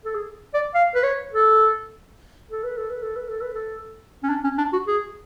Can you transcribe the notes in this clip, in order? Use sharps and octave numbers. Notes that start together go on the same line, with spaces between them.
A4
G#4
D5
F5
B4
C#5
A4
A4
B4
A4
B4
A4
B4
A4
B4
A4
C#4
D4
C#4
D4
F#4
G#4